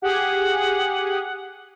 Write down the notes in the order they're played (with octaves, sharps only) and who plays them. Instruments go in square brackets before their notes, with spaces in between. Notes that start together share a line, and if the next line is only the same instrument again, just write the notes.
[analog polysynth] G4 G#4 [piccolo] F#5